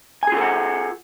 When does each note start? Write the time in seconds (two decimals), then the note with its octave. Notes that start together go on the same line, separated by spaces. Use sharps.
0.23 G#5
0.27 G#4
0.32 F4
0.37 A4
0.41 F#5